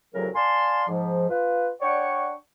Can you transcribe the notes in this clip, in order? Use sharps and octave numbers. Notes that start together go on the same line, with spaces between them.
C2 A2 C#3 F#3 F#4 A#4
D5 F5 G#5 A5 C6
G#2 F3
F4 B4
D4 C#5 D5 F#5 G5 C#6